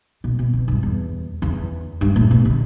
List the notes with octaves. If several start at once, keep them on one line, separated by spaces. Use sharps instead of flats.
B2
B2
B2
G2
E2
E2
G2
A2
B2
D3